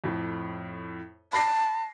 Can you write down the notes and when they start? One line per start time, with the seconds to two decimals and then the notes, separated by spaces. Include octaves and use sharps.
0.04 F2 A2
1.33 A5 B5 A#6 C7